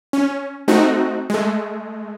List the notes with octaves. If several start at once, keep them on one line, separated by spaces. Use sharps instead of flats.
C#4
A3 C4 D#4 F#4
G#3 A3